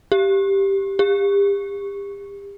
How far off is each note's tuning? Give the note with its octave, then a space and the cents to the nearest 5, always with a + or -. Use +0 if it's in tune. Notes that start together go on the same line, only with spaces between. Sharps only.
G4 +0
G4 +35